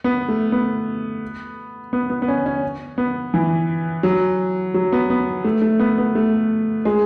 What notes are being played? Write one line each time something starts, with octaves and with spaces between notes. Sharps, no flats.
B3
A3
B3
B3
B3
B3
C#4
C#4
B3
E3
F#3
F#3
B3
B3
A3
A3
B3
B3
A3
G#3